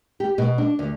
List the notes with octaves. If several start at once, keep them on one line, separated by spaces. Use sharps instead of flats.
G4
B2
D4
D2